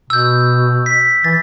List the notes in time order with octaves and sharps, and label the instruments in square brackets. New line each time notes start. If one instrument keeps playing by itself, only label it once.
[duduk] B2 [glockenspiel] E6 G6
[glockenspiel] B6
[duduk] E3 [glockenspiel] A6